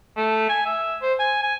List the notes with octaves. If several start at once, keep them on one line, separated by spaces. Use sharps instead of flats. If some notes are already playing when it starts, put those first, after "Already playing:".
A3
G#5
E5
C5
G#5
G#5